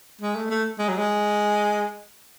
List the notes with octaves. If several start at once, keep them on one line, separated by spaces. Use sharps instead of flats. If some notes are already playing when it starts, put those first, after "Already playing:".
G#3
A3
A3
G#3
F#3
G#3